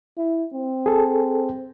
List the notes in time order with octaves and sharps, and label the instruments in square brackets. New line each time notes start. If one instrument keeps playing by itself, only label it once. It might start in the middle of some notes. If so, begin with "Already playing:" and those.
[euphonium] E4
C4
[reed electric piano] G#4 A4